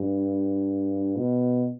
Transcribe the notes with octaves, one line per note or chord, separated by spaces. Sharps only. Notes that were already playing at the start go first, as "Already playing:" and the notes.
Already playing: G2
B2